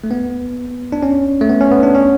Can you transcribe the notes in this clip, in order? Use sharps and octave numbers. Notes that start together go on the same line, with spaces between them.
A3
B3
D4
C#4
A3
B3
C#4
B3
D4
C#4